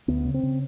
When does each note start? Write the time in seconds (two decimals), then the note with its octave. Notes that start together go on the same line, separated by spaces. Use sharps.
0.08 D2 B3
0.25 C#3
0.34 C4
0.43 C#3